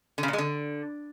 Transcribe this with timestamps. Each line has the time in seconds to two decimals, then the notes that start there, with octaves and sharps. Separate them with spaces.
0.18 D3
0.23 C#3
0.28 A#2
0.33 G#3
0.38 D3